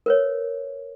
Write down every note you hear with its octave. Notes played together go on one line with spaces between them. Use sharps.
A#4 B4 C#5